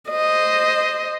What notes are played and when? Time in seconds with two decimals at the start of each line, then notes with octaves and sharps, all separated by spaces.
0.11 C5 D#5